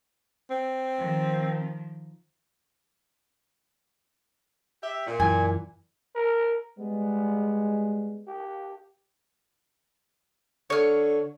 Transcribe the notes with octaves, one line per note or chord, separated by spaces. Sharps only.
C4
D#3 F3
G4 E5
A#2
F#2 E3 G#5
A#4
G3 G#3 B3
G4
D3 C#5 F6